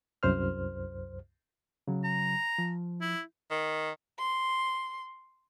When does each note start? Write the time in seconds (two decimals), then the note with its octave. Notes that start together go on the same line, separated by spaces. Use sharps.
0.23 C2 F#2 C5 F6
1.88 C#3 F#3
2.04 A#5
2.58 F3
3.01 E4
3.51 D#3
4.20 C6